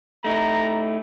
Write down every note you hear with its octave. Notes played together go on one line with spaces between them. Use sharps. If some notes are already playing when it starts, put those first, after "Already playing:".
A3 D#4 E4 A#5